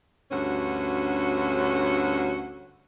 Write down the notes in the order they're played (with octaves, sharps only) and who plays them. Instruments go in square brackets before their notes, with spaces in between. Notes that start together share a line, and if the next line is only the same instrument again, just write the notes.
[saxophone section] D2 G2 C#4 F#4